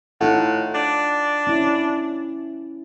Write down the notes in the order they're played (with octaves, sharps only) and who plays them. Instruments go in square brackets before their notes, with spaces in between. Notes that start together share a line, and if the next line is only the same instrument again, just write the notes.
[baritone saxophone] A2 [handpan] D#4 F4 F#5
[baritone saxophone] D4
[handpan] C#4 E4